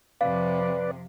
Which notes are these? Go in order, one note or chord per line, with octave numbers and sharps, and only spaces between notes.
F2 C3 B4 D5 F5